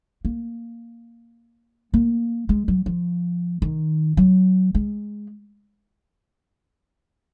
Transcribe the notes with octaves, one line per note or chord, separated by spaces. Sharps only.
A#3
A#3
G#3
F#3
F3
D#3
F#3
G#3